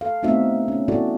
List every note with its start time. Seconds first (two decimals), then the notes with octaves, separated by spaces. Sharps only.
0.01 A4 F5
0.23 A3 B3 C4 D#4 F#4 E5
0.68 C#4
0.88 B3 E4 F#4 A4 D5